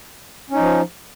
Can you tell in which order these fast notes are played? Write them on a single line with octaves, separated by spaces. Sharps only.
C#4 D#4 F3